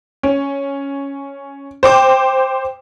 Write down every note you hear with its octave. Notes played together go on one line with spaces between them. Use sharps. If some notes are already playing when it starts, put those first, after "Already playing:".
C#4
C5 G5 D6